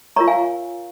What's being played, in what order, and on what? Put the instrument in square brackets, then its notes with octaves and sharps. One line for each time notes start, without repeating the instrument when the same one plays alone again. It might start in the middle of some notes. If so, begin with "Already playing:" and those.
[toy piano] F4 A#4 C#5 A#5 C#6
F5 G#5